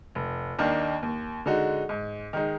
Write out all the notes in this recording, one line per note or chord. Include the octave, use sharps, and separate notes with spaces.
F1
D#2 D#3 A#3 D4
D#2
D3 G#3 D#4 F#4
G#2
D#3 G#3 D#4